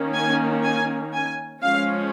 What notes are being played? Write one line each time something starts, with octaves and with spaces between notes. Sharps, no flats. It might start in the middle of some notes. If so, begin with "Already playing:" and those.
Already playing: D#3 A#3 C#4
G#5
G#5
G#5
F3 G#3 C#4 F5